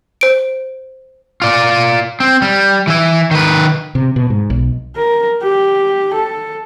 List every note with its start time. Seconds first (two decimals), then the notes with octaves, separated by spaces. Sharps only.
0.21 C5 D7
1.42 F4 D5
2.20 C4
2.42 G3
2.87 E3 E4
3.31 D#3 B4
3.95 C3
4.16 B2
4.30 G#2
4.50 B1
4.96 A#4
5.43 G4
6.14 A4